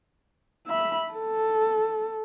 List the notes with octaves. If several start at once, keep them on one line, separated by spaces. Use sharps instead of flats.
E5 B5
A4